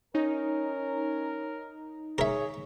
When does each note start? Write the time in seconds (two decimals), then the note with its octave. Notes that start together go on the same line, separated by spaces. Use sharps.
0.15 C#4 D#4 A#4
2.18 G#4 A#4 C#5 E5